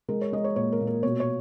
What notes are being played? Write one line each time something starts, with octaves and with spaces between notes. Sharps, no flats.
G#3 A#4
C#5
G#3 D#5
C#5
A#2 C#5
A#4
A#2
A#4
B2 C#5
C#5